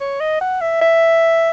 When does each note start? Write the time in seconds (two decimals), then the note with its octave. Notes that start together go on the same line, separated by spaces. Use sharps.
0.01 C#5
0.20 D#5
0.41 F#5
0.61 E5
0.81 E5